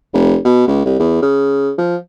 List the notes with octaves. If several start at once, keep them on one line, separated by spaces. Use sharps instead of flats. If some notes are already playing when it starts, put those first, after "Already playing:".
F1
B2
C#2
C2
E2
C#3
F3